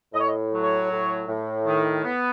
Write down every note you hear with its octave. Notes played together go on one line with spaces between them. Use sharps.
A2 D#5
C#5
D#5
F#3
C#5
A2
A2
D#3
B3